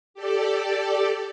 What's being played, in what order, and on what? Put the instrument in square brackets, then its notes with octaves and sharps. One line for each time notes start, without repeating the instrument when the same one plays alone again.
[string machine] G4 A4 D5